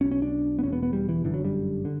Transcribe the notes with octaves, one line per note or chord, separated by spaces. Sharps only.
B1 B2 C#4
C#4
D4
B3
E1 E2 B2 C#4
B3
B3
G3
E3
G1 F#2 D3 E3
F#3
G3
D3